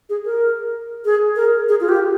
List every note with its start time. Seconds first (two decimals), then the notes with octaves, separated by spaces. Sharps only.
0.09 G#4
0.25 A#4
1.05 G#4
1.36 A#4
1.69 G#4
1.80 F4
1.89 G4